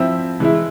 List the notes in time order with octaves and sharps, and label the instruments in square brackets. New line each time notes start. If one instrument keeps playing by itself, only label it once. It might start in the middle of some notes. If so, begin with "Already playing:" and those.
Already playing: [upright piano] F3 C4 E4 E5 E6
E3 G#3 E4